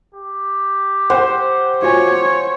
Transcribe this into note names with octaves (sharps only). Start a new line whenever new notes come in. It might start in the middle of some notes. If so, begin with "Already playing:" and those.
G4
C5 F#5 G5
F4 F#4 C#5 G#5